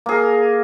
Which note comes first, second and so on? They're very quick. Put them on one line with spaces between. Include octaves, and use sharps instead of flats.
A#3 G#4 A#4